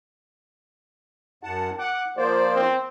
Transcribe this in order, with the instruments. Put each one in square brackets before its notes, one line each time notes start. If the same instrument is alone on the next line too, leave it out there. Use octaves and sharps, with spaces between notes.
[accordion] F#2 F#5 A5
[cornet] F#5 [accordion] D6
[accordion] F3 A#3 C5 [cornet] D5
[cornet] C4